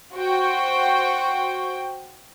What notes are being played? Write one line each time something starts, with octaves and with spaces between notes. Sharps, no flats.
F#4 C5 G5